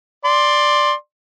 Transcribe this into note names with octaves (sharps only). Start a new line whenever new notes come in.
D5 C6